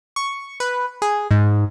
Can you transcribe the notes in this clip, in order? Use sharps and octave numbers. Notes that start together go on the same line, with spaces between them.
C#6
B4
G#4
G#2